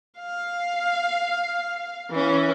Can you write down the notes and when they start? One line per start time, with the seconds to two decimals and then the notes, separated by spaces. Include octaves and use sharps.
0.19 F5
2.11 E3 C#4